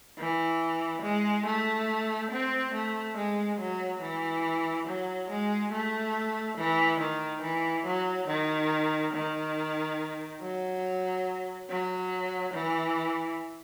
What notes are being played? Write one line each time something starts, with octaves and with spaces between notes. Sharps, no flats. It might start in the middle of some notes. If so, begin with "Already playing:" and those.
E3
G#3
A3
C4
A3
G#3
F#3
E3
F#3
G#3
A3
E3
D#3
E3
F#3
D#3
D#3
F#3
F#3
E3